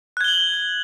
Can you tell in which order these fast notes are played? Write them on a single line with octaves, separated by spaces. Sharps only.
F#6 G#6 G7 F#7